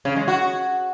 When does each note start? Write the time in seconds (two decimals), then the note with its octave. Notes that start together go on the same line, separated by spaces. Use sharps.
0.05 C#3
0.16 G#3
0.28 F#4